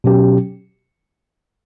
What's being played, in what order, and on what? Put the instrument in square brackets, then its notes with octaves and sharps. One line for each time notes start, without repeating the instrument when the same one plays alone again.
[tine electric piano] B2 F#3 C#4 G4